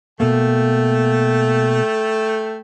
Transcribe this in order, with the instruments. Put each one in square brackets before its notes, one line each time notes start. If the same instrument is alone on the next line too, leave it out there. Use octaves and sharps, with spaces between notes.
[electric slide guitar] B2 A#3 [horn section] A3 G5